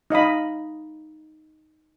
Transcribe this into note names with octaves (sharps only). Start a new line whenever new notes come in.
D#4 D#5 F5 B5